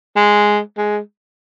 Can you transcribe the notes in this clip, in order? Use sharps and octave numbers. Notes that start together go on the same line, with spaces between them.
G#3
G#3